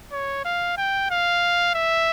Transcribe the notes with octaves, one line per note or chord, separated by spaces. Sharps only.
C#5
F5
G5
F5
E5